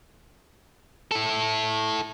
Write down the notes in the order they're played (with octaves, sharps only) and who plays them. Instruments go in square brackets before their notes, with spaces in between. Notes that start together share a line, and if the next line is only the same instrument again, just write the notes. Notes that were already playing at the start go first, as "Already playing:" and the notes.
[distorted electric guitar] E4 A4